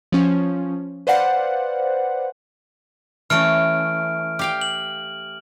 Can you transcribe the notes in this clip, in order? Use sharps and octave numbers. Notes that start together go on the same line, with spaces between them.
F3 C#4
B4 C5 D5 F5 F#5
E3 A3 C#4 F6 D7
G4 F5 G5
F#7